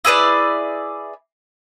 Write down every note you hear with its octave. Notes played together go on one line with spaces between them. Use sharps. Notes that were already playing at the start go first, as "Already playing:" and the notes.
E4 G#4 B4 D5